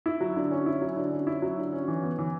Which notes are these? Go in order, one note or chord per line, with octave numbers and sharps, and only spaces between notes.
E4
F#3
D3
C#4
E4
F#3
D3
C#4
E4
F#3
D3
C#4
E3
B3
E3